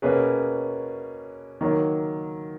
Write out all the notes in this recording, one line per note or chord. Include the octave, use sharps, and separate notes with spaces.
B2 A#3 C#4 G#4 B4
D#3 F#3 A#3